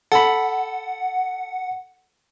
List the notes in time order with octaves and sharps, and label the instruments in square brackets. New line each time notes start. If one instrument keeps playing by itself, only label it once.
[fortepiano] A4 B5 [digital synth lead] F#5